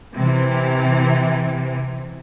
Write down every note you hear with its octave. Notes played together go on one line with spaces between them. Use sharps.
C3 E3